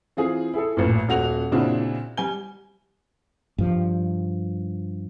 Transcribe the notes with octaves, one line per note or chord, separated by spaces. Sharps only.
E3 C4 F4 G#4
E4 G#4 A4
A1 A#2
D#1 F#4 F7
A#2 C#3 C4 D4 E4 F#4
G3 G#5 G7
G2 F3